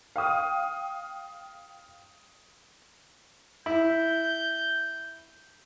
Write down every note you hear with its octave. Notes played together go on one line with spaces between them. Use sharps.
F5 G5 D#6 F6
E4 G6